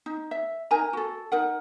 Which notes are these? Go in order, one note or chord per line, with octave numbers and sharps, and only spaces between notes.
D#4
E5
D#4 A#4 G#5 A#5
F#4 A4
D#4 A#4 F#5